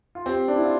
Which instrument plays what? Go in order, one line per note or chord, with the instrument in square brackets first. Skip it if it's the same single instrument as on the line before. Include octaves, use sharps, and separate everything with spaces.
[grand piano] F4
[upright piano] C4 [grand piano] G4
[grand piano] D4
E4
F4